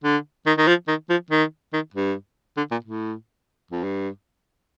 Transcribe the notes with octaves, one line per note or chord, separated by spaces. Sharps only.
D3
D#3
D#3
F3
D#3
F3
D#3
D#3
G2
D3
A#2
A2
F2
G2